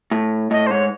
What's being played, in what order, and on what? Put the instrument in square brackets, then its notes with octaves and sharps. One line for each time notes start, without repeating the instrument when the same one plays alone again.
[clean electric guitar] A2
[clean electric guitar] A2 [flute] D#5
[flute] C5
[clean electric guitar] G#2 [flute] C#5